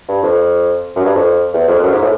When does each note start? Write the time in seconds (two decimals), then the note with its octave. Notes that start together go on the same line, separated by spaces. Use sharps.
0.08 G2
0.23 F2
0.96 F#2
1.05 G2
1.15 F2
1.53 E2
1.68 F2
1.79 F2
1.83 F#2
1.92 G#2
2.02 A2